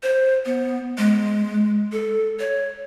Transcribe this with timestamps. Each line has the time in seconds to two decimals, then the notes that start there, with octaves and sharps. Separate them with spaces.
0.03 C5
0.45 B3
0.98 G#3
1.92 A4
2.39 C#5